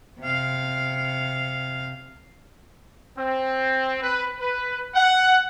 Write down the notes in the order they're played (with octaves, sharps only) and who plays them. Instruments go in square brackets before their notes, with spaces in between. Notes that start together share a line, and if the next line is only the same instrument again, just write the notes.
[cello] C3 F5
[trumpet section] C4
B4
B4
F#5